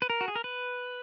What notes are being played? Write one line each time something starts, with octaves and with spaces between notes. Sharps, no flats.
B4
A#4
F#4
G#4
A#4
B4